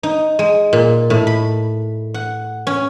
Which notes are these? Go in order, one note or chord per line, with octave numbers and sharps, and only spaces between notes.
D#4
G#3
A#2
A2
B5
F#5
C#4